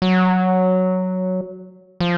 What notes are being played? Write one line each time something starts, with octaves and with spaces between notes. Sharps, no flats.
F#3
F3